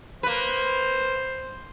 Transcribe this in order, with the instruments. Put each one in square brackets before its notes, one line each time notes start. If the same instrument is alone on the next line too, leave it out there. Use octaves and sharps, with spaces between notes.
[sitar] A#3 B4 [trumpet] C5